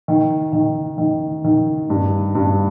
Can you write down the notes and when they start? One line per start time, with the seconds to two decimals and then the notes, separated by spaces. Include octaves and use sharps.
0.08 D#3
0.53 D#3
0.98 D#3
1.44 D#3
1.90 G2
2.35 G2